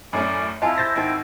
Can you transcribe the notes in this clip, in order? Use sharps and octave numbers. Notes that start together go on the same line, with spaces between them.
F#2 A2 C#4 D5 G#5
F2 E4 F4 D#5 G#5 A5
C5 G6 A6 A#6
G#1 C4 D#4 D#5